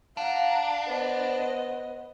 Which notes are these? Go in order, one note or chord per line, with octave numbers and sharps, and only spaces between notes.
D4 F5 F#5 A#5
B3 C5 D#5